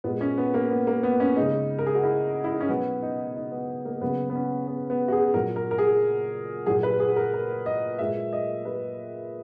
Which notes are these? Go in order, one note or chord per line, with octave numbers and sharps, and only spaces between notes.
A#2 G#3 B3
C#4
B3
A#3
B3
A#3
B3
C#4
C#3 G#3 D#4
A#4
G#4
F#4
E4
E4
D#4
C#4
B2 F#3 B3
D#4
D#4
B3
A#3
C#3 F#3 B3
B3
C#4
B3
B3
F#4
G#4
A#2 F#3 A#4
A#4
A#4
G#4
A#2 F#3 G#4
B4
G#4
A#4
A#4
D#5
A#2 G#3 E5
D#5
B4